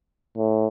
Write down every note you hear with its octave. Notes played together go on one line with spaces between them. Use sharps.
A2